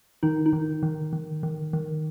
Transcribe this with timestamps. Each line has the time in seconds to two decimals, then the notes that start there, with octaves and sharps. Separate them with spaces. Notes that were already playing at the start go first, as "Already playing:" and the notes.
0.23 D#3 D#4
0.46 D#4
0.53 D#3
0.83 D#3
1.13 D#3
1.43 D#3
1.73 D#3